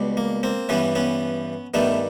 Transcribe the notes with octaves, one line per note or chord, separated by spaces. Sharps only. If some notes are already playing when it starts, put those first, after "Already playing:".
Already playing: C#2 B2 G3
A#3
A#3 C4
G2 E3 G3 B3 C#4
B3 C#4
G2 D#3 G3 A3 B3